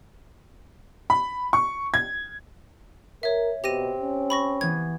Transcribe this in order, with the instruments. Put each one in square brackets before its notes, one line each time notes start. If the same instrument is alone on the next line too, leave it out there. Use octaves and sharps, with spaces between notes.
[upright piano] B5
C#6
G#6
[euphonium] A#4 [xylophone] C#5 E5
[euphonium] B2 [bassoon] C4 [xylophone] G4 A#6 D#7
[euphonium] C#4
[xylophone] B5 C#6 A#6
[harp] E3 B3 [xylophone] G#6